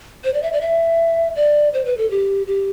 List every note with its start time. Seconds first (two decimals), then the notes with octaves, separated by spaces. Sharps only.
0.24 C5
0.34 D5
0.43 E5
0.53 D5
0.61 E5
1.35 D5
1.74 C5
1.85 B4
1.98 A4
2.11 G4
2.47 G4